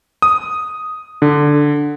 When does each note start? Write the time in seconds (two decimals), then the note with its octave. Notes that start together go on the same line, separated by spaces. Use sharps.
0.22 D#6
1.22 D3